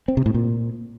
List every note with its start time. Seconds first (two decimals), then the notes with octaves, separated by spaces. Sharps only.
0.08 C4
0.17 C3
0.26 A2
0.34 A#2